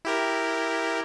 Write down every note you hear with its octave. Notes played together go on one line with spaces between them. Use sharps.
E4 G4 A#4